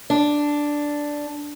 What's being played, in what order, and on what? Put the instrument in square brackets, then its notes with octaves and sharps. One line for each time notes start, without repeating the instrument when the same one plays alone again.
[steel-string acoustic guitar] D4